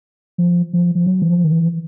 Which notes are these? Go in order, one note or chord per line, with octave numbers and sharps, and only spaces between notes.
F3
F3
F3
F#3
E3
F3
D#3
E3